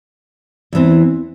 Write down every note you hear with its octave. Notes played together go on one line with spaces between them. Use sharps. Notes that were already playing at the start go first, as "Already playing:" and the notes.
E2 E3 C4